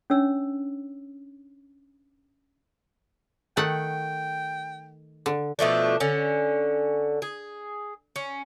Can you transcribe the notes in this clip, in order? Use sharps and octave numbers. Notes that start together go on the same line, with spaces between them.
C#4 D4 C#5 E6
D#3 A3 F#5 G5
D3
B2 F3 A3 D4
D3 C#4
G#4
C#4